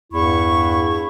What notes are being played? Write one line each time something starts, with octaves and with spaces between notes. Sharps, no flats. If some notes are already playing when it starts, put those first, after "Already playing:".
E2 G2 E4 C#6